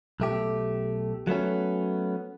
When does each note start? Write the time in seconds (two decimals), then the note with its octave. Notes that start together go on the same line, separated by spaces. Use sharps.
0.20 B1 A3 G4
1.27 F#3 A3 B3 C#4